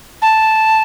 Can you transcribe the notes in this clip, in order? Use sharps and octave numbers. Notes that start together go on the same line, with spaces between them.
A5